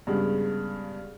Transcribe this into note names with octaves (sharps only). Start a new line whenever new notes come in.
G2 C#3 G#3 B3